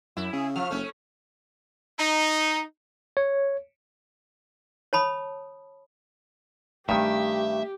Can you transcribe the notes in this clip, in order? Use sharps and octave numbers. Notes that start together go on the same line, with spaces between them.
F#2 E4
C#3 G#4
F3 F6
F#1 A3 C#4
D#4
C#5
C#5 A5 B5 D#6
G2 D#3 A3 C4 G4 E5